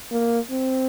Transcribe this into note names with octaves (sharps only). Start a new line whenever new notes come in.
A#3
C4